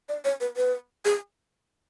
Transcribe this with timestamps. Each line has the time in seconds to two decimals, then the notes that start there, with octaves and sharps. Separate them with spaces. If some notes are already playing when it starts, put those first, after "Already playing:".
0.09 D5
0.25 C#5
0.40 B4
0.57 B4
1.05 G#4